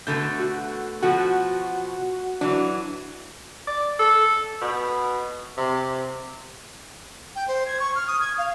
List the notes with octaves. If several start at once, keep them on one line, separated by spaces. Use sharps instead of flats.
B2 D3 A3 G6
F#4
B2 F3 F#4 F#5
E3 F#3 D4
D5
A4
B2
C3
G5
C5
G#6
C#6
F6
D#6
G#6
F5